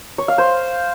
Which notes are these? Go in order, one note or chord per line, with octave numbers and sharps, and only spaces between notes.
C#5
F5
C5